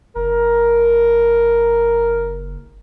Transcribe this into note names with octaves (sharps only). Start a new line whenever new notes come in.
F#1 A#4